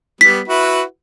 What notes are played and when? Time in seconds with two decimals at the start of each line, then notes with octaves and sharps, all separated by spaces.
0.21 G3 B3 B6
0.48 E4 F#4 B4